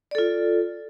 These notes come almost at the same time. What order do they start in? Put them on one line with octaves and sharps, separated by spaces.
D5 A4 F4